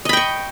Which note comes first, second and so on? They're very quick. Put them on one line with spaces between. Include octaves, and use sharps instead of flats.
D#5 B5 G5 C#6